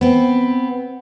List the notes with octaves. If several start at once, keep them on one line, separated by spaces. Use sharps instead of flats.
B3 C4